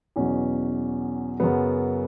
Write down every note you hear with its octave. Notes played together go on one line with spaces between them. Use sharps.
E2 B2 F#3 C#4
F#2 C#3 F#3 B3